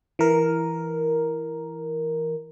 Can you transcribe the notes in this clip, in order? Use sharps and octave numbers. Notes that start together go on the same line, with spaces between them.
E3 A#4